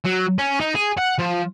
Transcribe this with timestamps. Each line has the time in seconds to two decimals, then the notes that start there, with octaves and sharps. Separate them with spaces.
0.05 F#3
0.38 C#4
0.60 D#4
0.75 G#4
0.97 F#5
1.18 F3